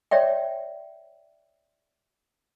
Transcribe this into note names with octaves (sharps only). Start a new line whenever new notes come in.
C#5 D5 E5 G5